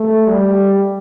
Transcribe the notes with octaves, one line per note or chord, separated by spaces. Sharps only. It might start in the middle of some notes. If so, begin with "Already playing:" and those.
Already playing: A3
G3